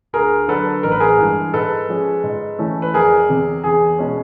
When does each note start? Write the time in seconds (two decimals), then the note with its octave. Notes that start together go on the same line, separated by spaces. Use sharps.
0.13 D2 G#4 A#4
0.48 D3 F#3 A4 B4
0.83 A1 A#4
0.92 B4
1.00 G#4 A#4
1.18 G2 E3 G#3
1.53 G#2 A4 B4
1.88 F3 G#3 C#4
2.24 G#2
2.59 E3 A3 C#4
2.82 B4
2.94 F1 G#4 A#4
3.29 E2 C3
3.64 E2 G#4
3.99 B2 G#3 C#4